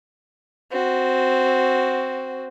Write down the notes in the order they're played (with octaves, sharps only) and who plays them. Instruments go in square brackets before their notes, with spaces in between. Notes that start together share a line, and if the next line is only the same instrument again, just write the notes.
[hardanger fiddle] C4 F#4